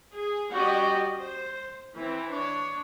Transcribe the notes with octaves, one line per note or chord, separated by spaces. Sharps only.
G#4
G3 C#4 F#4 G4 D5 D#5
C5
E3 C4
D4 C#5